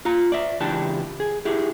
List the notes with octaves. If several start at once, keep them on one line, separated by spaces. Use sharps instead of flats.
F4 A#5
D5 E5
C#2 E3 D4 G4 A5
G#4
E4 G4 G#4